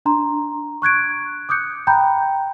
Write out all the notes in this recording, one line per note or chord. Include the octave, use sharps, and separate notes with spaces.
D4 A#5 C6
C#6 F#6 G#6 D7
D6 D#6 F#6 G6 C#7
G5 A#5 B5 G6